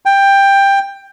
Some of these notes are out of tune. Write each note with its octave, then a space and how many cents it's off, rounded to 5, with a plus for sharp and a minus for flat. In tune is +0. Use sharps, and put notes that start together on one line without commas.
G5 +15